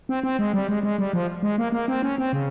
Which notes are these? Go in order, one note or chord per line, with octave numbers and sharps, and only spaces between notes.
C4
C4
G#3
G3
G#3
G#3
G3
F3
G#3
A#3
A#3
C4
C#4
C4
C#3